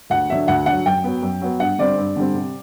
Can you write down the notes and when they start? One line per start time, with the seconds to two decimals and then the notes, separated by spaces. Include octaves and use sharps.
0.10 D2 F#5
0.29 D3 F#3 E5
0.48 D2 F#5
0.66 D3 F#5
0.71 F#3
0.85 F#2 G5
1.04 F#3 B3
1.22 F#2
1.41 F#3 B3
1.59 G2 F#5
1.78 D3 G3 C4 D5
1.97 G2
2.16 D3 G3 C4
2.34 C3